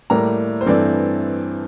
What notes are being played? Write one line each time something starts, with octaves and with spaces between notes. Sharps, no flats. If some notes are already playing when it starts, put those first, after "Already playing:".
A2 G3 A#3 A#5
C5
G2 E3 A3 C4 D5